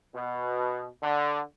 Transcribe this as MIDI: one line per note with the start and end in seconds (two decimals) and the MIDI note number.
0.15 0.86 47
1.02 1.40 50